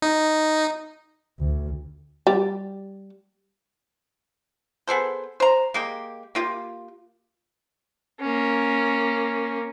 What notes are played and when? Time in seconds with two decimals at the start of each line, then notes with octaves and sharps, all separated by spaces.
0.02 D#4
1.40 D2
2.27 G3
4.88 B3 G#4 A4 C5
5.40 C5 A#5
5.74 G#3 A#3 G4
6.35 A#3 F4 G4
8.20 A#3 C#4